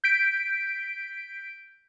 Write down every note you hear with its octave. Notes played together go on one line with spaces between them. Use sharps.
G6 B6 D7